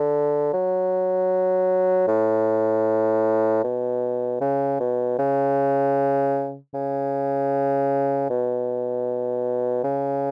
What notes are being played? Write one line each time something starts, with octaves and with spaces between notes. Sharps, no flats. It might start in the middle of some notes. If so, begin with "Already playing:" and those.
Already playing: D3
F#3
A2
B2
C#3
B2
C#3
C#3
B2
C#3